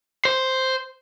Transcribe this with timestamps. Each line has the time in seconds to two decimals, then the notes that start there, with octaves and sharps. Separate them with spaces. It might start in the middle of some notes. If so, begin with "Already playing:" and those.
0.25 C5